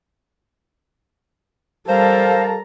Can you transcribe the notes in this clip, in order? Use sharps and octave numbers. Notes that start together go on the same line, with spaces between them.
G3 A4 A#4 C5 F5 A5 A#5